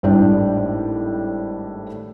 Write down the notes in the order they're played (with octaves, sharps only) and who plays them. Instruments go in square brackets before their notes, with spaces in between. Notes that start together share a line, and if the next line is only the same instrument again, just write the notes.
[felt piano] G#1 A2 G3 D4 G5